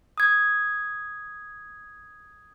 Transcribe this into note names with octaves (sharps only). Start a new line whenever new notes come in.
D#6 G#6